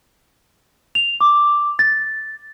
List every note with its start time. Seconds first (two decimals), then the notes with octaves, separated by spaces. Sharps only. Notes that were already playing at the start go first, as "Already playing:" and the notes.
0.95 F7
1.21 D6
1.79 A6